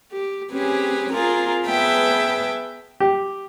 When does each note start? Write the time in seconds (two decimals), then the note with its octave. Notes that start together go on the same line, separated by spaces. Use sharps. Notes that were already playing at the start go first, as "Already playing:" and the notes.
0.12 G4
0.52 C4 C#4 G4 G#4 B4
1.13 C4 F4 G#4 A#4
1.67 B3 G#4 B4 E5 G5 A5
3.00 G4